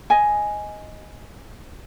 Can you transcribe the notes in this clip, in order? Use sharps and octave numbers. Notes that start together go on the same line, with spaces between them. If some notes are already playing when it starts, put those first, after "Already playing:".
D#5 G#5